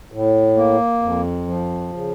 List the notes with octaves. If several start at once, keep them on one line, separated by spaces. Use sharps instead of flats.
A2
A#3
F2
F3
C#3